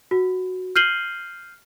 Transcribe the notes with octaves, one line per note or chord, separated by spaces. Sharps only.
F#4
F6 G6 C7 D#7 F#7 G7